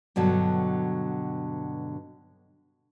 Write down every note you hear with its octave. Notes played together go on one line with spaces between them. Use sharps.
G2 B2 D3 F#3